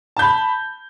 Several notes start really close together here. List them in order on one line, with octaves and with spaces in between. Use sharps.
A5 G6 B5